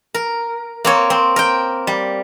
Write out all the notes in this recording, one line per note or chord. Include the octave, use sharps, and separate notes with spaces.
A#4
A#3 C4 C#5
C4
A#4 G5
G3